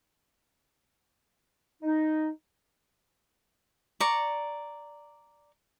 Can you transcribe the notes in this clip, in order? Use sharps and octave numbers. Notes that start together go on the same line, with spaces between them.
D#4
D5 A#5 C#6